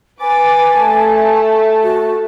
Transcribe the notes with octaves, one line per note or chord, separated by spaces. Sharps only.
B4 G#5 D6 A6
A3 A5
F#4